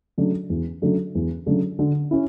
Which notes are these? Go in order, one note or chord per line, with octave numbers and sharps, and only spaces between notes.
C#3 F#3 A3 D4
E2
C#3 F#3 A3 D4
E2
C#3 F#3 A3 D4
D3
C#4 E4